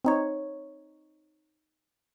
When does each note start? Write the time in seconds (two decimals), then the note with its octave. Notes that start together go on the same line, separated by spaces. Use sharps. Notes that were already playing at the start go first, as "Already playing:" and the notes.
0.05 C4 D#4 C#5